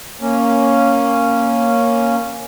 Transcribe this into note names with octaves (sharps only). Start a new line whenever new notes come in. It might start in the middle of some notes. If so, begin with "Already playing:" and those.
A#3 C#4